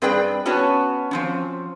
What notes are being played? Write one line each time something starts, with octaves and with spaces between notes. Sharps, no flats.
G2 C4 G#4 B4 D5 G5
B3 C#4 F#4 C#5 A5
F3 C4 C#4